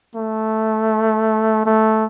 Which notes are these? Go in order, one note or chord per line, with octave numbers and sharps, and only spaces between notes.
A3
A3